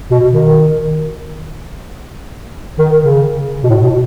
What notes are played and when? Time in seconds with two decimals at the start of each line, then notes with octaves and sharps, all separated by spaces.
0.11 B2
0.33 D#3
2.79 D#3
3.01 C#3
3.64 B2
3.69 A2
3.83 B2